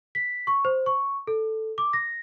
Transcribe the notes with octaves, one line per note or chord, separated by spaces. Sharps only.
B6
C#6
C5
C#6
A4
D6
A#6